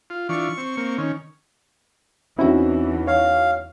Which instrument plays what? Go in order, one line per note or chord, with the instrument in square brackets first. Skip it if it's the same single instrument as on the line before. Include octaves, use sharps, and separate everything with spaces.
[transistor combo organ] F4
[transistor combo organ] E3 D4 F4 [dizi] C#6
[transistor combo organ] C4
A#3 C4
D#3 C#4
[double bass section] E2 E3 [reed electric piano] C4 E4 [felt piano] C#4 D#4 F#4
[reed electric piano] C#5 [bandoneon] F5